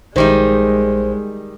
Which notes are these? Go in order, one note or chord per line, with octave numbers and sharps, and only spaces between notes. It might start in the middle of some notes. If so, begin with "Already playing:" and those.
A#1 D#3 G3 G#3 D#4 C5